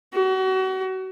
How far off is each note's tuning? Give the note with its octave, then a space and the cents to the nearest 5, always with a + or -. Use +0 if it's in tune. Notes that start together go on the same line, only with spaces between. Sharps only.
F#4 +35